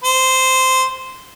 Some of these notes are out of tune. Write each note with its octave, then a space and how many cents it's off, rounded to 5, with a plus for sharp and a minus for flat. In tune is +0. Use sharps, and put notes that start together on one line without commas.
C5 -10